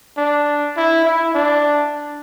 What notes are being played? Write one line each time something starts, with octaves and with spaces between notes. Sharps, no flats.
D4
E4
E4
D4